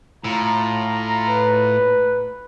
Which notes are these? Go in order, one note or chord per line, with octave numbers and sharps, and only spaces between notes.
A2 F4 A#5
B4